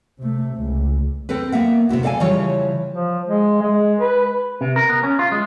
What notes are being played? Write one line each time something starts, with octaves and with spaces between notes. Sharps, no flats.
C3 A3
C#2
C4 A4 B4
A#3 B3 E5 F#5
C3 B3 E4 F#4
A4 D5 F5 F#5 G#5
C#3 E3 F3 G3 F4 C#5
F3
G#3
G#3
B4
C3
A#4
B3
C#4
F4
G#3